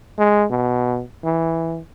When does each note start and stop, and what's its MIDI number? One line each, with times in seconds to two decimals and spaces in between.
0.19 0.45 56
0.51 1.02 47
1.24 1.80 52